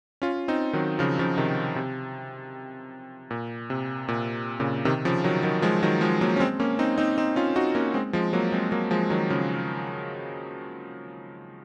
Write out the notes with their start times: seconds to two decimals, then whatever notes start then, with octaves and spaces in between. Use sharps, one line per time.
0.22 C#4 F4
0.48 C4 D#4
0.73 D#3 F#3
0.99 C#3 F3
1.19 C#3 F3
1.37 C3 D#3
1.76 C3
3.31 A#2
3.70 C3
4.08 A#2
4.60 A#2 C#3
4.85 C3 D#3
5.05 C#3 F3
5.24 D#3 F#3
5.43 D#3 F#3
5.62 F3 G#3
5.83 D#3 F#3
6.01 F3 G#3
6.21 F#3 A#3
6.36 C#4
6.40 G#3 C4
6.60 A#3 C#4
6.79 C4 D#4
6.98 C4 D#4
7.17 C4 D#4
7.36 C#4 F4
7.56 D#4 F#4
7.75 A#3 C#4
7.94 G#3 C4
8.13 F3 G#3
8.33 F#3 A#3
8.52 G#3 C4
8.72 F#3 A#3
8.91 F3 G#3
9.10 D#3 F#3
9.30 C#3 F3